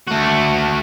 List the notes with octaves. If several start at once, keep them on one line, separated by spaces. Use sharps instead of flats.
A3 F#4